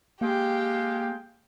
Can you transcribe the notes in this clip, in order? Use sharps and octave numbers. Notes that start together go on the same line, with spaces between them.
G#3 A#3 G4 F5 G5